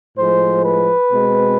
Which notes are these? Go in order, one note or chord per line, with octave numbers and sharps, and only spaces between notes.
A2 F3 G#3 C5
B4
B2 G#3 C4